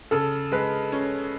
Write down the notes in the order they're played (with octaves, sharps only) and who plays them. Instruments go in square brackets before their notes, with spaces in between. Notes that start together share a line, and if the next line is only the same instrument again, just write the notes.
[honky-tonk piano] C#3 [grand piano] A4
[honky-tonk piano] G#3 [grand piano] B4
[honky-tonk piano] C#4